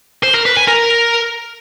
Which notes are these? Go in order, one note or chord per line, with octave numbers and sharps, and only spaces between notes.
C5
A#4
B4
G#5
A#4